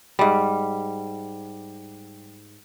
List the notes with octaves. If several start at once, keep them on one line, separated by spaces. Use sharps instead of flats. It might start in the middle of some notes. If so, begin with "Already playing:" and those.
G#2 G3